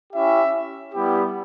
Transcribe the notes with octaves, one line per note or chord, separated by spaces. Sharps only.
C#4 E4 G4 E5
G3 B3 E4 G4